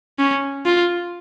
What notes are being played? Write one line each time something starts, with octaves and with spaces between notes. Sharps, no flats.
C#4
F4